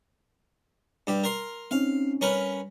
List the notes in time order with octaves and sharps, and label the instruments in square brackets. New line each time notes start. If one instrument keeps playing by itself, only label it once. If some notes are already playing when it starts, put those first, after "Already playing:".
[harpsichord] G2 G4
A#4 C6
[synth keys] C4 C#4 D#4 [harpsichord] F5
[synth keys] G3 [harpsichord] C#4 A#4 B4